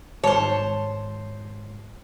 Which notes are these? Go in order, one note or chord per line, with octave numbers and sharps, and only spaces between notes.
G#1 C5 C#5 A5